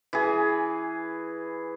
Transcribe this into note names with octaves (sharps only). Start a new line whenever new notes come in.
E3 G#4